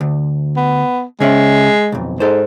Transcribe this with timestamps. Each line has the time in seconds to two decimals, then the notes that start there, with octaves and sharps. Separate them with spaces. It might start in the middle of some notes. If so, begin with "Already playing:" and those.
0.01 D2
0.57 B3
1.20 C#3 G#3 C#4 E5
1.92 B1 F2
2.20 G#2 A4 C5